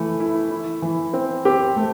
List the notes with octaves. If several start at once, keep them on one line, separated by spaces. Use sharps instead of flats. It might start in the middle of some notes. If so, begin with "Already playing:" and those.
Already playing: E3 A3
E4
E4
E3
C4
C4 G4
A3